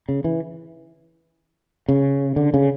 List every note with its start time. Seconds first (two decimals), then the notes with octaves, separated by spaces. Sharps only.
0.09 C#3
0.24 E3
1.88 C#3
2.36 D3
2.54 C#3